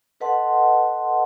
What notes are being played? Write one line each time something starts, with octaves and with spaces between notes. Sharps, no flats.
A4 B4 D#5 F#5 A5 C6